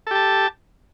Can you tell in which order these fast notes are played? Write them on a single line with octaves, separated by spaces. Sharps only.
A4 G4 A5